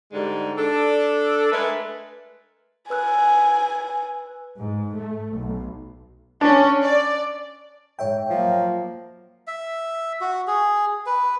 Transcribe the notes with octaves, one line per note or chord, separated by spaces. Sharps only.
G#2 D3 G3 G#3 D#4
D4 A4
G#3 A3 A#4 B4
B4 G#5 E6 F#6
G#2
A3
B1
C#4 D4
D5
G#2 C#5 E5 G5
F3 F#3 A#3
E5
F#4
G#4
B4